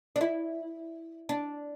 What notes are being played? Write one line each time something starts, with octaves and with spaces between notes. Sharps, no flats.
D4
E4
D4